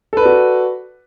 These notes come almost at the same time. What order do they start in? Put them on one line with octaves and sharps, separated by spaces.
A4 B4 D5 F#4